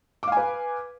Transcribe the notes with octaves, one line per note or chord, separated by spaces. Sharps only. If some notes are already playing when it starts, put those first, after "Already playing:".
B4 F5 G#5 D6